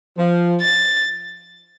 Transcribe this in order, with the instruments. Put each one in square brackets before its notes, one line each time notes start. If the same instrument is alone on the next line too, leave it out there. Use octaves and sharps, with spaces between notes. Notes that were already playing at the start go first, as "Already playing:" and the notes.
[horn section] F3
[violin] A6